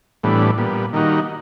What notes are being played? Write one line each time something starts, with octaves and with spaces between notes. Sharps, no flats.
A2 E3 G3 B3 D4
A#2 G3 B3
D#3 G3 A#3 D#4 F#4